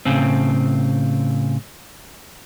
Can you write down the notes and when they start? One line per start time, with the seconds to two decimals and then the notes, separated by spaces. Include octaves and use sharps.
0.06 A2 C#3 C4